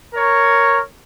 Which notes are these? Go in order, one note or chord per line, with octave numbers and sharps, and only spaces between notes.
A#4 C#5